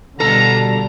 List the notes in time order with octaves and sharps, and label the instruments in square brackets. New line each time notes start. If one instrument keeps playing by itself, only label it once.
[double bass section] B2 D3 G3 [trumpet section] D4 F4 A#5 [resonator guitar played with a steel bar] A4